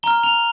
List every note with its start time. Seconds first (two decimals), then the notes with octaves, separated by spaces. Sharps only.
0.03 A#5 F6 G7
0.24 F7